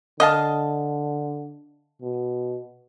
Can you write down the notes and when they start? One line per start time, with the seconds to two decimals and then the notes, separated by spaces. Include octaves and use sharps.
0.20 D3 D#5 F5 A5
2.02 B2